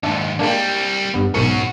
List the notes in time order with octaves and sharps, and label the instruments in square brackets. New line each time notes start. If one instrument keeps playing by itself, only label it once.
[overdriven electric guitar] D#2 G#2 [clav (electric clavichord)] D4 E5
[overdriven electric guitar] C2 G3 [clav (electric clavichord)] G#3 A#3 D4
[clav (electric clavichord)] G2 B3
[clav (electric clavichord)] B1 G#2 A#4 [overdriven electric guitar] C#4 F#4